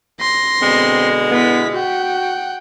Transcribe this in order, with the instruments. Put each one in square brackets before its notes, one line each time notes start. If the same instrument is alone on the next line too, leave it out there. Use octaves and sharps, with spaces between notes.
[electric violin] C6 A#6
[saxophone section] B2 D3 G#3 [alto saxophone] C4
[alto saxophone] B3 [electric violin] E4 B6
[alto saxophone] F#4 [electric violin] F#5 G5